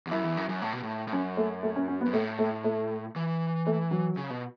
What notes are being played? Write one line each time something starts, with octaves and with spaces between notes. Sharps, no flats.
E2
F#2 E4
E2
F#2
F#2
A2
B2
A2
A2
F#2 C#4
A3
A3
C#4
C#4
B3
F#2
A2 A3
A3
A3
E3
A3
F#3
C#3
B2